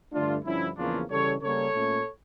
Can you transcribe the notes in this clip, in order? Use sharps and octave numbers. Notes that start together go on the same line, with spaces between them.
G2 D3 A3 D4 F4
G2 D3 F3 C#4 E4
E2 C#3 F3 A#3 C#4 D4 F4
C#3 E3 G3 A4 C#5
C#3 G3 A#3 C#4 A4 C#5
A#2 A3 C#4